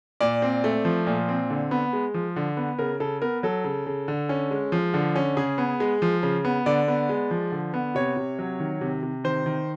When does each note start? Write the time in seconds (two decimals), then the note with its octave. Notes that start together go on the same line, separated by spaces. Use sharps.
0.20 A#2 D5
0.42 C4
0.64 A3
0.85 F3
1.07 A#2
1.28 C4
1.50 D3
1.71 B3
1.93 G#3
2.14 F3
2.36 D3
2.57 B3
2.79 C#3 A#4
3.00 C#3 A4
3.22 B3 A#4
3.43 F#3 A4
3.64 C#3
3.86 C#3
4.08 D3
4.29 C#4
4.51 G#3
4.72 F3
4.94 D3
5.16 C#4
5.37 C#3 G#4
5.58 B3
5.80 G#3
6.02 F3
6.23 C#3
6.45 B3
6.66 D3 D5
6.88 B3
7.09 G#3
7.31 F3
7.52 D3
7.74 B3
7.95 C3 C#5
8.17 C3
8.39 F#3
8.60 D#3
8.81 C3
9.03 C3
9.24 D#3 C5
9.46 D#3